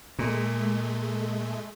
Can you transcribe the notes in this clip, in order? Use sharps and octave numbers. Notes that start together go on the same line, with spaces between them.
A#2 G#3 A3